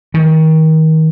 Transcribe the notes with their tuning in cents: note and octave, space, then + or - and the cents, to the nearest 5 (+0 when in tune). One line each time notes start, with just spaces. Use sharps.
D#3 +30